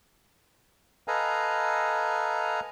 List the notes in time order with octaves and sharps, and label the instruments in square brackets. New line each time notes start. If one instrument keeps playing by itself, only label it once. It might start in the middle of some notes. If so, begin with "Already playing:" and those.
[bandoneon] A4 B4 D#5 F5 G#5 A#5